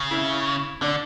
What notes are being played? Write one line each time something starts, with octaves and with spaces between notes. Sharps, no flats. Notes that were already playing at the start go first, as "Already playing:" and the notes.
Already playing: C#3
E4
D3 D4